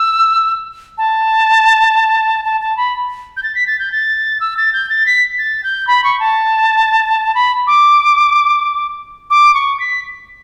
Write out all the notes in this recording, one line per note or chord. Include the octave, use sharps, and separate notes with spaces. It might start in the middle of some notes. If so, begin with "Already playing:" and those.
Already playing: E6
A5
A5
A5
B5
G6
A6
B6
A6
G6
A6
E6
A6
G6
A6
B6
A6
G6
B5
C#6
A5
B5
D6
D6
C#6
B6